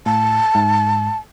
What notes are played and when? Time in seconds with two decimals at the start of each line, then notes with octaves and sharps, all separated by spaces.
0.06 A2 A5
0.55 G#2